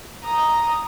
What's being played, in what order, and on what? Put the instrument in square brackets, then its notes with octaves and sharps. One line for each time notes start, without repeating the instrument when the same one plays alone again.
[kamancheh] A#5 D#6